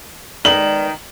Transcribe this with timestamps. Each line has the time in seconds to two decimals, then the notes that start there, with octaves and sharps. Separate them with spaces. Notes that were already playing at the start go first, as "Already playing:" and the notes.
0.45 D#3 G#3 B3 D5 F#7